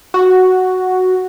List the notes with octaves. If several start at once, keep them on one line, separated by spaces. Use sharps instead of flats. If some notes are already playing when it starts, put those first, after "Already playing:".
F#4